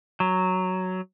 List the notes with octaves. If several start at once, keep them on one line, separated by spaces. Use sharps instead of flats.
F#3